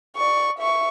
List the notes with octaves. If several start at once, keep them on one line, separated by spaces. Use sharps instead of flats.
D5 C#6
E5 C#6